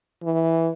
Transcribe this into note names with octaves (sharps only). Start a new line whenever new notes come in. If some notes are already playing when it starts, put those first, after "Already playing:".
E3